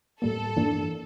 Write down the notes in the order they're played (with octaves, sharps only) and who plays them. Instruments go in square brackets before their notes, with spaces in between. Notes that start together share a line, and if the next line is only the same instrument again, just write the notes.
[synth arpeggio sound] A2 G3 A#3 [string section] A4
[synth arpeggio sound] G2 E3 A#3 D4